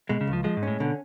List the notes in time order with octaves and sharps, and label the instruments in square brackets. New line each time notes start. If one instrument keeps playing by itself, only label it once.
[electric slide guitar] B2 [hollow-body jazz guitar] G#3
[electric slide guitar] C#3
[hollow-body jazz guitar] C#2
[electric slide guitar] F3
[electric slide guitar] F3 [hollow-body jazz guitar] G#3
[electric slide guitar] G#2
[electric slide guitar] A2 [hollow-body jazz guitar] C#4
[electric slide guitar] B2 [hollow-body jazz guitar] D3